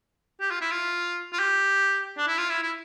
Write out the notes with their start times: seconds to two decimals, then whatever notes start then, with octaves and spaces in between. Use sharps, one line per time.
0.40 G4
0.51 F4
0.61 E4
0.71 F4
1.32 F4
1.40 G4
2.17 D4
2.27 E4
2.38 F4
2.50 E4
2.62 E4